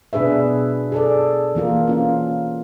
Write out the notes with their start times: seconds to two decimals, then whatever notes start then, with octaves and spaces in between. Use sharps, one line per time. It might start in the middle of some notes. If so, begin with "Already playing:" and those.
0.13 B2 D4 G#4 B4 E5
0.92 G#4 A4 D5
1.55 E3 A#3 F4 A#4
1.88 C#4 F4